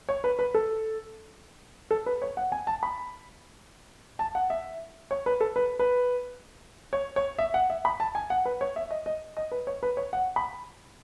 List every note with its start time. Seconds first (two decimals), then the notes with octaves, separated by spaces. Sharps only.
0.09 C#5
0.24 B4
0.39 B4
0.54 A4
1.91 A4
2.06 B4
2.22 C#5
2.37 F#5
2.52 G#5
2.67 A5
2.83 B5
4.19 A5
4.35 F#5
4.50 E5
5.11 C#5
5.26 B4
5.41 A4
5.56 B4
5.79 B4
6.93 C#5
7.16 C#5
7.38 E5
7.54 F#5
7.70 E5
7.85 B5
8.00 A5
8.15 G#5
8.30 F#5
8.45 B4
8.61 C#5
8.76 E5
8.91 D#5
9.06 D#5
9.37 D#5
9.52 B4
9.67 C#5
9.83 B4
9.97 C#5
10.13 F#5
10.36 B5